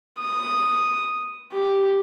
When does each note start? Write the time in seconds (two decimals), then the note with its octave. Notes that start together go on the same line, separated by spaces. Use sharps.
0.19 D#6
1.52 G4